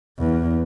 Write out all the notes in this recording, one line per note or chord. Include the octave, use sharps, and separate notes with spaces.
E2